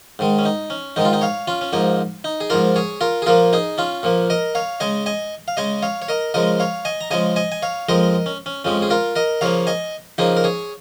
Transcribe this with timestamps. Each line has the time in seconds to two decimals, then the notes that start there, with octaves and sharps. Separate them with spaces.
0.19 G#2 D#3 G#3
0.39 C#4
0.45 D#4
0.70 C#4
0.96 G#2 D#3 G#3 D#4
1.05 F4
1.13 D#4
1.21 C#5 F5
1.48 C#4 F4
1.61 C#4
1.73 G#2 F3 A#3 D#4
2.24 D#4
2.41 G#4
2.50 G#2 F3 A#3 F4 A#4
2.76 G#4 C#5
3.01 F4 A#4
3.22 G#4
3.26 A#2 F3 A#3 F4 A#4
3.53 D#4 G#4
3.78 C#4 F4
4.03 A#2 F3 A#3
4.30 A#4 D#5
4.55 C#5 F5
4.80 C#3 G#3 D#5 G#5
5.06 D#5 G#5
5.48 F5
5.57 C#3 G#3 D#5 G#5
5.83 C#5 F5
6.02 C#5
6.08 A#4 D#5
6.34 C#3 F3 G#3 A#4 D#5
6.60 C#5 F5
6.85 D#5 G#5
7.01 A#5
7.11 C#3 F3 G#3 D#5 G#5
7.36 D#5 G#5
7.52 G#5
7.62 C#5 F5
7.89 F2 F3 G#3 A#4 D#5
8.26 C#4
8.46 C#4
8.64 F2 F3 G#3 C#4
8.82 G#4
8.90 F4 A#4
9.16 A#4 D#5
9.41 C#3 F3 A#3 C#5 F5
9.67 D#5 G#5
10.18 C#3 F3 A#3 D#4 G#4
10.37 A#4
10.44 G#4 C#5